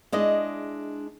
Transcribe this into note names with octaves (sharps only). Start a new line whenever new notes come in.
G#3 D4 E4 D#5